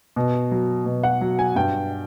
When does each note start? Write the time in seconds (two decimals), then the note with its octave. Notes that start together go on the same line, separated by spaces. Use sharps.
0.16 B2
0.51 F#3
0.86 B2
1.03 F#5
1.21 F#3
1.39 G#5
1.56 G2 G5